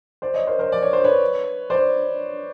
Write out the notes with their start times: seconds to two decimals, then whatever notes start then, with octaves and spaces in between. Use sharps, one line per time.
0.22 C5 D5
0.34 C#5 D#5
0.47 A#4 C5
0.59 A#4 C5
0.72 D5
0.83 C#5
0.93 C5
1.04 B4 C#5
1.70 C5 D5